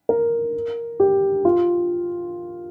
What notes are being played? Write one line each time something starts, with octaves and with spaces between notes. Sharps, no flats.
A#4
G4
F4